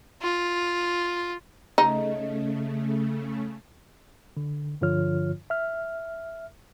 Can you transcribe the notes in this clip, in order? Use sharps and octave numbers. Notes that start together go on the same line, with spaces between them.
F4
C#3 A3 D#4
D3
G2 D3 F3 F4 C#5 F6
E5 F6